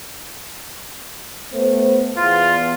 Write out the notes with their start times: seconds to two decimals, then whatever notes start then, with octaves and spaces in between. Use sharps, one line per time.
1.53 A3 B3 C5
2.17 E2 F4